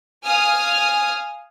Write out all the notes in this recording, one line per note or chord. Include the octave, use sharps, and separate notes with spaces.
F5 G#5 D#6 F6